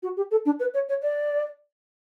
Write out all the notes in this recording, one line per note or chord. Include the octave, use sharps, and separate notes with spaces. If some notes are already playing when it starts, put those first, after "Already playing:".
F#4
G4
A4
D4
B4
C#5
C#5
D5